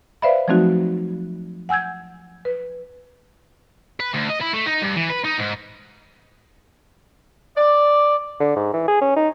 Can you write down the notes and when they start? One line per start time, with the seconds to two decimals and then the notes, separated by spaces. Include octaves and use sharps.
0.22 B4 C5 D5 E5 F5 B5
0.48 F3 F#3 A3 C4 D#4 F#4
1.69 F#5 G#5 E6 G6 G#6
2.45 B4
4.00 B4
4.14 D2
4.30 D#5
4.41 E4
4.54 A3
4.66 D#4
4.82 G2
4.97 E3
5.10 B4
5.25 D#4
5.39 G#2
7.58 D5
8.40 D3
8.56 G#2
8.74 E3
8.88 G#4
9.01 C#4
9.16 D#4